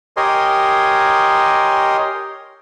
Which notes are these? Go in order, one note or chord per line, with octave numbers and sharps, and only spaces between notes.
G4 A#4 C#5 D#5 G#5 C6